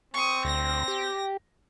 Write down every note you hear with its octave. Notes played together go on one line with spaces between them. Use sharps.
C4 C#6 D#6
D2 A#6
G4